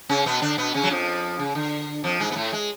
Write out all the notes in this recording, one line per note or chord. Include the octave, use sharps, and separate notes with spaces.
C#3 C#4
B2 B3
D3 D4
B2 B3
C#3 C#4
F#3
F2 F3
C#3
D3
F2 F3
G#2 G#3
B3
A2 A3
G#3